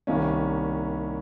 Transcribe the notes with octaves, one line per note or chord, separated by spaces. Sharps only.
C2 C3 D#3 A#3 C#4